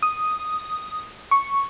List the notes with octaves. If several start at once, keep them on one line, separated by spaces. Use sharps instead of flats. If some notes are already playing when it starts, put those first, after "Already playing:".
D#6
C#6